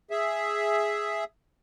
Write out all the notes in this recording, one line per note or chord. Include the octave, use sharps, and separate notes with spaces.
G#4 E5